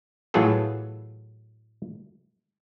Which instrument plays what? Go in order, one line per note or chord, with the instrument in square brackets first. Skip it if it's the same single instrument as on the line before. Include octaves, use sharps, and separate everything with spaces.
[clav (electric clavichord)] A2 E3 F#3 F4 G#4 A4